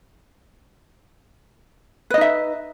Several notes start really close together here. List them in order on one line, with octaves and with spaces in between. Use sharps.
B4 D#5 D#4 E5